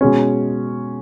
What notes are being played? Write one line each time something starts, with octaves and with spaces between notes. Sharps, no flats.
B2 G#3 C#4